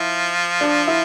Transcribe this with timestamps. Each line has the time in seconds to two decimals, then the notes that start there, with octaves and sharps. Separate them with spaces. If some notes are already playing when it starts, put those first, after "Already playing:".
Already playing: F3 E4
0.61 D4
0.87 E4